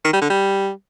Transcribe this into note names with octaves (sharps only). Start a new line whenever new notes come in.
D#3
G3
D3
G3